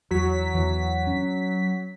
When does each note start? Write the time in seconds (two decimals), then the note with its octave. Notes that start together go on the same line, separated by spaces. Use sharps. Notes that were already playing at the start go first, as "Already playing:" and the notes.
0.11 E2 F#3 B6
0.54 E2 E3
1.07 C#4